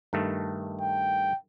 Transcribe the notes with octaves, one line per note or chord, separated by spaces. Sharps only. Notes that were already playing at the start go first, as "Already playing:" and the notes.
G2 D#3 A3
G5